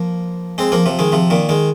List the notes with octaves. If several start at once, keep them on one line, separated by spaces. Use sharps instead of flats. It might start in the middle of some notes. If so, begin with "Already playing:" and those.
Already playing: F3 A#3
G#3 C4
F3 A#3
C3 F3
D#3 G#3
C3 F3
A#2 D#3
D#3 G#3